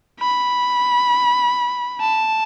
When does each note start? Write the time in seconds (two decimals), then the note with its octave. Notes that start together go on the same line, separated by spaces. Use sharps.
0.20 B5
2.01 A5